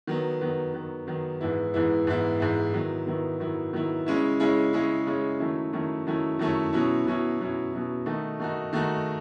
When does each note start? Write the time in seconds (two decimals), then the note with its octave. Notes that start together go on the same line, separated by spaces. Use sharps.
0.07 D#3 F#3 B3
0.41 D#3 F#3 B3
0.74 D#3 F#3 B3
1.07 D#3 F#3 B3
1.41 G#2 E3 B3 E4
1.74 G#2 E3 B3 E4
2.07 G#2 E3 B3 E4
2.40 G#2 E3 B3 E4
2.73 D#3 F#3 B3 E4
3.07 D#3 F#3 B3 E4
3.40 D#3 F#3 B3 E4
3.73 D#3 F#3 B3 E4
4.06 C#3 G#3 C#4 E4
4.40 C#3 G#3 C#4 E4
4.73 C#3 G#3 C#4 E4
5.07 C#3 G#3 C#4 E4
5.40 D#3 F#3 A3 C#4 E4
5.73 D#3 F#3 A3 C#4 E4
6.07 D#3 F#3 A3 C#4 E4
6.39 D#3 F#3 A3 C#4 E4
6.73 B2 F#3 C#4 E4
7.06 B2 F#3 C#4 E4
7.40 B2 F#3 C#4 E4
7.73 B2 F#3 C#4 E4
8.06 D#3 A3 D#4 F#4
8.40 D#3 A3 D#4 F#4
8.73 D#3 A3 D#4 F#4